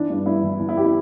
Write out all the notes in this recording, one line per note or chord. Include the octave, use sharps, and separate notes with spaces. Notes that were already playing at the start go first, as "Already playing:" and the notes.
Already playing: E3 D4
G2
G2 E4
E3
E3
E4
G4
E4